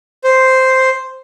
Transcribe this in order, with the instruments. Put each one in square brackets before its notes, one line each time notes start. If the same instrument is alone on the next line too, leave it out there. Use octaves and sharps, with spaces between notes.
[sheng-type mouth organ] C5